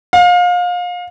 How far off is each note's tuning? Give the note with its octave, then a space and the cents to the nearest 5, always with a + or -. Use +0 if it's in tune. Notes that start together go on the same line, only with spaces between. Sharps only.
F5 +30